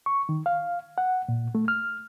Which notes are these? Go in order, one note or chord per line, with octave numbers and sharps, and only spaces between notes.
C#6
D#3
F5
F#5
A#2
A3
F6